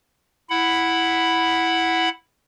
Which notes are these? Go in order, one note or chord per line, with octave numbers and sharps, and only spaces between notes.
E4 F#5 B5